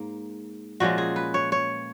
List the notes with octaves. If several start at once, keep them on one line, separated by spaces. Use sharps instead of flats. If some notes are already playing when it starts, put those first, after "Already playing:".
Already playing: G#2 A#3
A#2 F3 G#3 C#4 F#4
G#4
B4
C#5
C#5